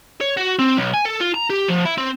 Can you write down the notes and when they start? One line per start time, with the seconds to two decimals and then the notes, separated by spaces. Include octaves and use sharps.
0.21 C#5
0.37 F#4
0.59 C4
0.77 B1
0.94 G#5
1.05 A4
1.20 F4
1.34 A#5
1.50 G4
1.68 F3
1.85 E4
1.98 C4